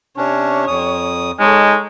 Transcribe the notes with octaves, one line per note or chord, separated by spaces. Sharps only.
C3 C#4 D4 C#5
F2 D#6
G#3 D#4 A4 C#5